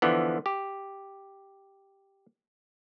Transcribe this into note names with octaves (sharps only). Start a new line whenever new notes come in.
D3 E3 F3 B3
G4